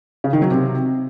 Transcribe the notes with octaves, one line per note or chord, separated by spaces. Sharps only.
C#3
D#3
F#3
C3